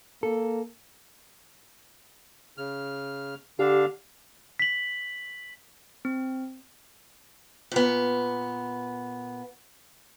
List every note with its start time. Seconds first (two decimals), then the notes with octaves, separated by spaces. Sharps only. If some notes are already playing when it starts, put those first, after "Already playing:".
0.23 A#3 A4
2.58 C#3 F6
3.59 D3 D4 G4 F5
4.59 B6 F#7
6.05 C4
7.72 A#2 B3